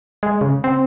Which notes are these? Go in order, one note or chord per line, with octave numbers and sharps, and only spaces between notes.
G#3
C#3
C4